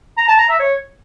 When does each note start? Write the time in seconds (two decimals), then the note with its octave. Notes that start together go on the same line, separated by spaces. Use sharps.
0.18 A#5
0.28 A5
0.39 A#5
0.49 E5
0.60 C#5